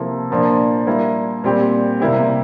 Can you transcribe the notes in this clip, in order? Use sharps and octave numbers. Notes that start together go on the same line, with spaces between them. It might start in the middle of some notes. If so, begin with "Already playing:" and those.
Already playing: C3 F3 A#3 E4 A4
A#2 F3 A#3 D4
G3 A#3 E4
A#2 G3 C4 G4
C3 G3 A#3 E4 G4